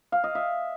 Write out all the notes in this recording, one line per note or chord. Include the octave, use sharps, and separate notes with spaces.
F5
D#5
E5